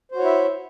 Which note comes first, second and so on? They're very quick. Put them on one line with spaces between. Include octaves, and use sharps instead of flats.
C5 F#4 C#5 E4 E5